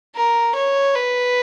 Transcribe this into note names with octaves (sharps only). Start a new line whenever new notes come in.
A#4
C#5
B4